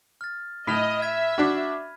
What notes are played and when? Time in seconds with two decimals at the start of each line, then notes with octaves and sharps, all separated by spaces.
0.21 F6 A6
0.67 A2 D#5 B5 F6 F7
1.02 E5 G#6 B6 D#7
1.38 D4 F#4